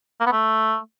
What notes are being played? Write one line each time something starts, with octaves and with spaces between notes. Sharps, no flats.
A#3
B3
A3